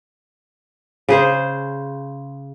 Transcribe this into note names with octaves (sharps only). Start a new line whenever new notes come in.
C#3 G#4 C5